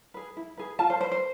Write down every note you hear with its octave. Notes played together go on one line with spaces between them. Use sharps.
G#4 B4
E4
G#4 B4
F4 A5
C5
B4 C5
C5